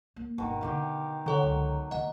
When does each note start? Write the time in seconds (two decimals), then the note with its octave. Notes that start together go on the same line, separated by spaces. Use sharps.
0.16 A#3
0.38 G1 B2 D#3
0.61 D3 D#3 D4 G4 F5
1.26 D3 F#3 A4 C#5
1.43 C#2
1.91 D#3 D#4 D#5 F#5